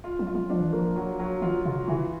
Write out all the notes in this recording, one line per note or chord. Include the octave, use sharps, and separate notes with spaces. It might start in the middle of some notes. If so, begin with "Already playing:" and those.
F4
F#3
F4
F#3
F3 D4
E3
F3 A#3
F#3
F#3
E3 F4
C3 F4
C#3 E3